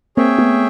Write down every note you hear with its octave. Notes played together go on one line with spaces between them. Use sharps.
A#3 C4 G#4 C#5 E5 G5
A3 B3